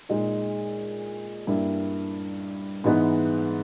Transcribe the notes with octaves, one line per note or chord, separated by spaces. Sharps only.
A#2 G#3 D#4
G2 G3 A#3 E4
G#2 E3 G#3 B3 D#4